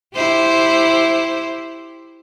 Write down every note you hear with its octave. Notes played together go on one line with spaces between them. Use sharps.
E4 G4 C5